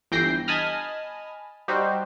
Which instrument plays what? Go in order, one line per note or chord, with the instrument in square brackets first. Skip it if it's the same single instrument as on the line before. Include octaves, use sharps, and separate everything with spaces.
[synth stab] G1 E3 G5 G6 A#6 C7
D#5 G#5 A5 B5 D#6 F6
G3 D#4 F#4 G4 C5